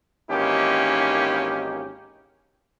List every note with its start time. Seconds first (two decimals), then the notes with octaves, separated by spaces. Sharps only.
0.30 G#1 E3 A#3 C#4 D#4 G4